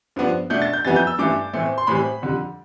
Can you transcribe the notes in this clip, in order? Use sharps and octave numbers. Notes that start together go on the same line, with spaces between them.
G2 F3 B3 D4
B2 A3 D4 G6
A6
G6
F2 E3 G3 B3 E4 A6
G6
E6
G2 E3 A3 E4 D6
A2 E3 A3 C4
C6
A2 E3 G3 C4 B5
F2 D3 G3